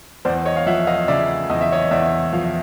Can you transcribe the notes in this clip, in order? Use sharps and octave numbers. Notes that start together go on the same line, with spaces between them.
E2 C5 D5
C#5 D#5
F5
F3 E5 F#5
D#5 F5
C#3 D5 E5
E2 D#5
E5
C#5 D#5
E2 D5 E5
F3 F5
E5